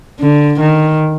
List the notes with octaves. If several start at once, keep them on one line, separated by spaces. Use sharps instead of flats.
D3
D#3